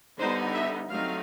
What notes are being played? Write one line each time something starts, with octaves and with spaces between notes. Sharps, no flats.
D3 G3 B3 D#4 C5
E5
F#3 A3 C4 D#4 F5